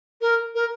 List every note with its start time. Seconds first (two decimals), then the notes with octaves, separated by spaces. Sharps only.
0.21 A#4
0.55 A#4